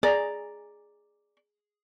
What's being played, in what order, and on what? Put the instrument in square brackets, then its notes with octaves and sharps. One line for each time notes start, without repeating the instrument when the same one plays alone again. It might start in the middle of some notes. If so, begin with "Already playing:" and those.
[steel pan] G#4 A#5 [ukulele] D5